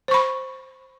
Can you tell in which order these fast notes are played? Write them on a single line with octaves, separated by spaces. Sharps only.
C5 C#6 B5